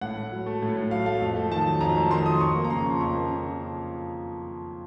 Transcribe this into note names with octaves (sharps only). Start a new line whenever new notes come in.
A2 F#5
A2
F#3
A3
A2
A2
F#3 F5
A3 F5
F2
A3
D#3 A5
F#3
F2 A#5
A3
D#3 C6
F#3 D#6
F2 C#6
A#3
A#5
C#3 C6
F3 C#6
F2 C#6
A#3
C#3
F3